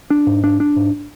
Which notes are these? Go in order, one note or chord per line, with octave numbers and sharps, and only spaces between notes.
D4
G#2
D4
D4
G#2